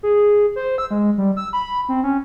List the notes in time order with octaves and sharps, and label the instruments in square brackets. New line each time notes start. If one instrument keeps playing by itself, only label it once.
[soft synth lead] G#4
C5
E6
G#3
G3
E6
B5
C4
C#4